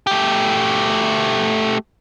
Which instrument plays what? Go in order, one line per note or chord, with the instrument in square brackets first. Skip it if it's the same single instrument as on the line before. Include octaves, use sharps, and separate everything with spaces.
[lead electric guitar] A3 G4